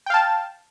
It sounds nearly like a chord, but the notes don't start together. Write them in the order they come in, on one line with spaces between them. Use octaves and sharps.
G5 F5 A5